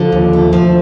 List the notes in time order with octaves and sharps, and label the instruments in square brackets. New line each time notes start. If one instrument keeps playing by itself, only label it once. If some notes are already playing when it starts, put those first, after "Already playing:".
Already playing: [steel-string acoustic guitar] D3 [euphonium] F3
[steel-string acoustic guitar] D#2
A3
F3